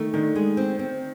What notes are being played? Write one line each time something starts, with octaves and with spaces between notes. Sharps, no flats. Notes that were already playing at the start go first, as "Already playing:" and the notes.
Already playing: D#3 A3
D#3 D4
G#3
C4
C4